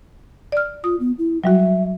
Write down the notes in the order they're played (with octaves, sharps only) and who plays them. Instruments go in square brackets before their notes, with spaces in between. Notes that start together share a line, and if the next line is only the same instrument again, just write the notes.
[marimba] D5 F6
[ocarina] F4 [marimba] D#6
[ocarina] B3
E4
[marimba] F#3 G3 F#4 [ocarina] E5